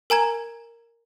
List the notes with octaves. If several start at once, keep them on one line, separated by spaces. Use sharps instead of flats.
A#4 G#5 A#5 G#6